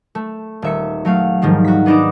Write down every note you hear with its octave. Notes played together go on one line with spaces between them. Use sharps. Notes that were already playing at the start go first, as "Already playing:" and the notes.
A3
D#1 E5 C#7
F#3 A3 F5
G#2 D#3 F3 G3
F#4 B6
B3 D4 D#4 D6 E7